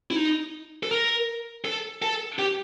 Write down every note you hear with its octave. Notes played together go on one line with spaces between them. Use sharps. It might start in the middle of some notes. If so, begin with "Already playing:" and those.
E4
D#4
A4
A#4
A4
A4
G4